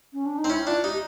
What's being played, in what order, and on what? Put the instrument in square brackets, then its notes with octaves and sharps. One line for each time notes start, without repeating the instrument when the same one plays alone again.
[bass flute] C#4
D4
D#4
[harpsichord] C4
[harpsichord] C#4 [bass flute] E4
[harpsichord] D4 [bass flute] F4
[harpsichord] D#4 [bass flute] G4